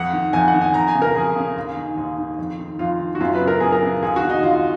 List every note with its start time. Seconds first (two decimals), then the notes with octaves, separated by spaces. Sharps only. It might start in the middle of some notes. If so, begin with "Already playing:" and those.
Already playing: F2 F#5
0.13 D#3
0.33 F2 G#5
0.48 F#5
0.54 D#3
0.61 G#5
0.74 F2 A#5
0.88 G#5
0.95 C#3
1.02 A#4
1.15 F2 G#4
1.36 C#3
1.57 D#2
1.77 D#3
1.97 D#2
2.18 D#3
2.39 F2
2.59 D#3
2.79 F2 F4
3.00 D#3
3.15 F#4
3.20 F#2 F4
3.34 B4
3.41 C#3
3.48 A#4
3.60 F#2 G#4
3.72 A#4
3.82 C#3
4.02 D#2 G#4
4.16 F#4
4.23 D#3
4.30 D#4
4.43 D#2 F4